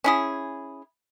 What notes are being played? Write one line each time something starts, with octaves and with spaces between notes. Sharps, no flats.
C#4 E4 G#4